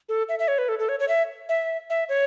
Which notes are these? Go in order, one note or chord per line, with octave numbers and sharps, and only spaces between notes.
A4
E5
E5
C#5
B4
A4
A4
C#5
C#5
E5
E5
E5
C#5